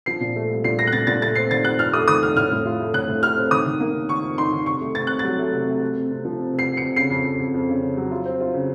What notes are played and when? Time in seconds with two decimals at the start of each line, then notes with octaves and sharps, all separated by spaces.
0.06 F3 C7
0.20 A#2
0.36 A3
0.49 C2
0.64 A#2 C7
0.78 A3 A#6
0.87 F#6
0.93 A#2 A6
1.07 A#2 A6
1.21 A3 A6
1.35 C4 C7
1.50 D#3 A6
1.64 C4 F#6
1.79 F2 F6
1.93 A3 D#6
2.08 D#3 D#6
2.22 F2 F6
2.36 A2 F6
2.51 A2
2.65 F4
2.79 A3
2.94 A2 F#6
3.09 A2
3.22 A3 F6
3.37 C4
3.51 D#3 D#6
3.66 D#3
3.80 A#3
3.94 D#3
4.09 D#3 C#6
4.23 F2
4.38 D#4 C6
4.53 D#3
4.66 C3 C#6
4.81 A3
4.95 C3 A6
5.07 C3 F#6
5.19 F#3 A6
5.38 A3
5.53 C3
5.67 A3
5.81 C3
5.96 C3
6.11 C3
6.25 F3
6.39 C3
6.53 C3
6.59 C7
6.68 C3
6.77 C#7
6.82 C3
6.96 C#3 C7
7.10 F2
7.25 F2
7.39 F2
7.54 F2
7.69 C#3
7.82 C#3
7.97 F#3
8.11 F4
8.25 C4
8.40 F4
8.54 C#3